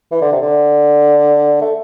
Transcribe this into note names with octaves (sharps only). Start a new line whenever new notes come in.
E3
D3
C3
D3
A3